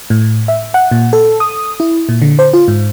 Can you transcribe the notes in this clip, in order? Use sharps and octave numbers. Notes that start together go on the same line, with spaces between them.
A2
E5
F#5
A#2
A4
D#6
E4
A#2
D3
C5
F4
G#2